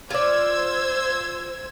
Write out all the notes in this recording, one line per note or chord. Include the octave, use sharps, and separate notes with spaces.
F4 C5 D5 E6 G#6